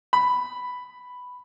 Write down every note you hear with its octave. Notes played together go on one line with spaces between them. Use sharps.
B5